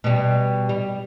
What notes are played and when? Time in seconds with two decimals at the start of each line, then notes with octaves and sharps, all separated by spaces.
0.04 B2 G3
0.69 G3